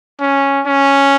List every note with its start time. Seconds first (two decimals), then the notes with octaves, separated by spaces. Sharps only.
0.21 C#4
0.67 C#4